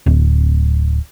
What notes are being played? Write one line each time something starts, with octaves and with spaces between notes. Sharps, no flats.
D1